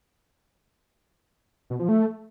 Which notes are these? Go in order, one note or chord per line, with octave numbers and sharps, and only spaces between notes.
B2
F3
A3